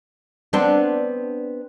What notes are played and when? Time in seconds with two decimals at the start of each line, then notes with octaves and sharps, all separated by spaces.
0.53 B3 C4 D4